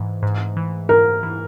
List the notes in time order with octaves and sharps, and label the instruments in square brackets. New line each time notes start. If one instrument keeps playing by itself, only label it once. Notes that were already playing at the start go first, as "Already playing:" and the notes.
Already playing: [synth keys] G#2 E3 A3
G#2
E3
[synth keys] G#2 [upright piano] A#4
[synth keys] E3